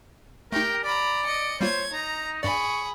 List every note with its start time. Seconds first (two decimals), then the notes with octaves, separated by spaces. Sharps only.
0.52 A3 D#4 G4 A#4 G5
0.84 D5 A#5 B5
1.25 D#5 C#7
1.61 G3 A#3 F4 C5 C#5 G#6
1.92 D#4 A#5
2.43 G2 G#4 D5 B5 C#6